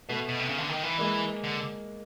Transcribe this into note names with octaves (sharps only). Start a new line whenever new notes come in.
B2 A3 B3
B2
C3
C#3
D3
D#3
E3
G#3 A#3
D3